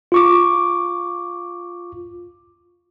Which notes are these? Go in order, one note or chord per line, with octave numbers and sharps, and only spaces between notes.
F4 C#6 D6